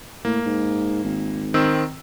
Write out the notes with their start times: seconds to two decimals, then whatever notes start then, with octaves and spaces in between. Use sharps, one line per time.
0.25 A2 A#3
0.46 G#2
1.04 G#1
1.54 D#3 C4 E6